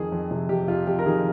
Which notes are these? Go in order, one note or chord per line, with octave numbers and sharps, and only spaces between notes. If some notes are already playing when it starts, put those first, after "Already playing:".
Already playing: F2 D#3 G#4
F2
C3
F2 G4
F2 F4
F2 G4
A#4
D#3 G#4